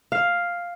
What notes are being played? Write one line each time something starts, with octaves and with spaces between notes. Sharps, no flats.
F5